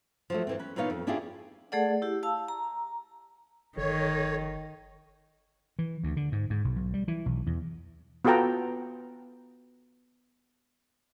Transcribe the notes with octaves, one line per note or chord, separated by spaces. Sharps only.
F3 F#3 A3
F2 E3 C4
C#4 B4
A#2 E3 B3 D#4 C#5 F5
F2
C#4 D4 E4 F4 G4 G#4
A3 G#4 A4 D5 F#5
E4 G4
F5 A5 E6
A#5
G1 D#3 A4 C#5
E3
D2
D3
G#2
G#2
B1
B1
G3
E3
B1
E2
B3 F4 F#4 A4 G5 A#5